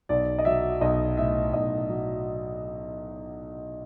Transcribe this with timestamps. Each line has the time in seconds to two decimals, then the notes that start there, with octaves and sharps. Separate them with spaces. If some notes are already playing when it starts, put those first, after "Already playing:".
0.09 B1 D5
0.39 D#5
0.45 F#3 E5
0.81 B1 D#5
1.18 A2 E5
1.53 B1 D#5
1.89 F#3